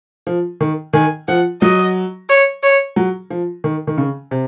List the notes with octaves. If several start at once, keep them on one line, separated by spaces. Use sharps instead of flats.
F3
D#3
D#3 G#5
F3 F#5
F#3 D#5
C#5
C#5
F#3
F3
D#3
D#3
C#3
C3